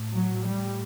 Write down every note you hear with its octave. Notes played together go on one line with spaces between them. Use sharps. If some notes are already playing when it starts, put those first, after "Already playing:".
Already playing: A2
F#3
A2 G3